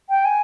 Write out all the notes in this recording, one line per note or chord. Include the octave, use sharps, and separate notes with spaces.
G5
G#5